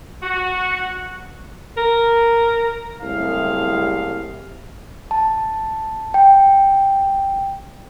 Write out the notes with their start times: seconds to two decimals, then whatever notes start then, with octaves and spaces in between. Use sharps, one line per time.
0.23 F#4
1.77 A#4
3.01 F#1 C2 A2 C3 G#4 F5
5.11 A5
6.14 G5